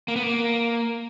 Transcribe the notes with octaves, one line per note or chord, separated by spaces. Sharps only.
A#3
B3
A#3